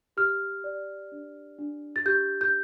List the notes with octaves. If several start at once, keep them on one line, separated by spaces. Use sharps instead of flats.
G4 F6
D5
D4
D4
A6
G4 G6
G6